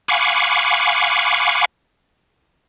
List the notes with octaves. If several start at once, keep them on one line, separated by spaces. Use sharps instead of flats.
F5 F#5 G#5 B5 C#6 D6